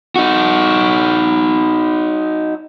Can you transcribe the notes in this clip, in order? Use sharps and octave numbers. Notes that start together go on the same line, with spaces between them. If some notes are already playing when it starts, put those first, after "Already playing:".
D#4 F#4